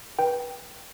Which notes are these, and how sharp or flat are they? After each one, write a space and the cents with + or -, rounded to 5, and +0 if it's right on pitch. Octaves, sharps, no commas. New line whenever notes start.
B4 -25 G5 +0